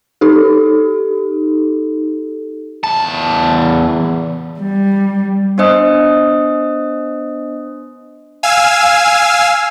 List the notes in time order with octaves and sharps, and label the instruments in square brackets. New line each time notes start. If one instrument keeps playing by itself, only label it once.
[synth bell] D#4 G4 A4
[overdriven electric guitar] E2 A5
[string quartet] G3
[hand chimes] B3 D4 C5 D#5 D#6
[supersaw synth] F5 G#5 E6